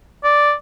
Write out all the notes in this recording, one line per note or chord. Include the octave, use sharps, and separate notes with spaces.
D5